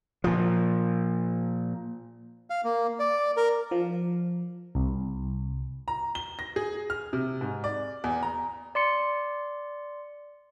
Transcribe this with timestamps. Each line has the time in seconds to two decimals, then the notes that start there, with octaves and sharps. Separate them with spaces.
0.24 A#2 F3
2.50 F5
2.64 A#3
2.99 D5
3.37 A#4
3.71 F3
4.75 C2
5.88 A#5
6.15 G7
6.39 A#6
6.56 G#4
6.90 F6
7.13 C3
7.41 G#2
7.64 D5
8.04 E2
8.23 A#5
8.75 D5 C6 C#7